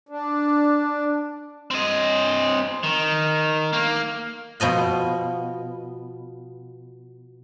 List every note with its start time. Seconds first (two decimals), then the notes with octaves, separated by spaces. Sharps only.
0.09 D4
1.71 C4 D#5
2.83 D#3
3.73 A#3
4.60 B2 F3 D#5 F#5